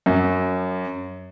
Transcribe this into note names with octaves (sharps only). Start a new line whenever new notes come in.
F#2